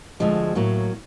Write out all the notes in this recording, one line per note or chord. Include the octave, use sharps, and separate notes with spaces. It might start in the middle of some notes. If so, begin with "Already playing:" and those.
D2 D3 F3 G#3
A2 F#3 A#3